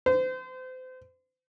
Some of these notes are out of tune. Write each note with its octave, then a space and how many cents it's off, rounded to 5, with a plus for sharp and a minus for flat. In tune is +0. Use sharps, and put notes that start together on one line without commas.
C5 -35